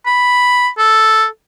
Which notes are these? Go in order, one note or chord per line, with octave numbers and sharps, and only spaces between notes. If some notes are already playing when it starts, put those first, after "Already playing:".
B5
A4